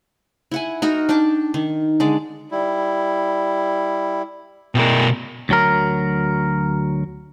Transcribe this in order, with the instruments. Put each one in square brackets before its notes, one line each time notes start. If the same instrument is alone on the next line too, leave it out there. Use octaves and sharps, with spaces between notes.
[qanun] E4 F#5 G#5
D#4 F#4 A#4
D4 G5 A5 D6
D#3
D3 G#3 D5
[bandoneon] G3 E4
[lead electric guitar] B2 A#4 [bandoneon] G#3 E4 G5
[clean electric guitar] D2 F#3 A#4